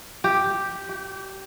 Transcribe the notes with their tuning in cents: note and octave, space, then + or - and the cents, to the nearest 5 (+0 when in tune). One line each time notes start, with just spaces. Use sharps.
G4 +0
G4 -30